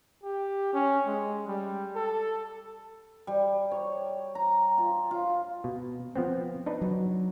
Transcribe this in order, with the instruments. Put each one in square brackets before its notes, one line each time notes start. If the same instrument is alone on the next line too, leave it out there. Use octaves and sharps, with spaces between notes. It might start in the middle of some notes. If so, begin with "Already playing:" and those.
[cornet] G4
C#4
G#3
G3
A4
[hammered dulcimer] G3
C#5
A#5
F4
F4
[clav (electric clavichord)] B2
F3 B3 C4
D4 D#4 B4
[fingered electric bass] F#3